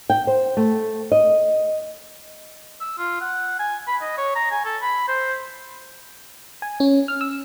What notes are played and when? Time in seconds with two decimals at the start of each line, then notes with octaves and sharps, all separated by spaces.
0.10 G5
0.27 C5
0.57 A3
1.12 D#5
2.81 E6
2.98 F4
3.21 F#5
3.59 G#5
3.87 B5
4.02 D#5
4.18 C#5
4.36 A#5
4.51 G#5
4.65 A4
4.82 B5
5.08 C5
6.62 G#5
6.80 C#4
7.08 F6
7.21 E6